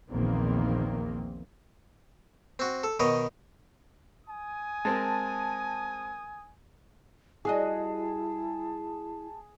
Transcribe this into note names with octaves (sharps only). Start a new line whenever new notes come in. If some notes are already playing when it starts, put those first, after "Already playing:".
A#1 E2 A#2 D#3 A#3 C4
C4 F#4
A4
B2 D#3 C#5 D#5
G#5 D#6
G#3 C4 A#4 A5
G3 E4 F#4 G#4 D#5 A5